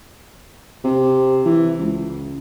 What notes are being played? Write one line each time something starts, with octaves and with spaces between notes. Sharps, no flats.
C3
E3
C#2